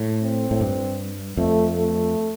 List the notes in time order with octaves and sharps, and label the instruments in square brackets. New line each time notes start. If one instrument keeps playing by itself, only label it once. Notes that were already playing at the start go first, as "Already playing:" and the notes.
Already playing: [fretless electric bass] A2
[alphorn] C4
[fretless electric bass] A2
G2
[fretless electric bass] F2 [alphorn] A3
[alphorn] A3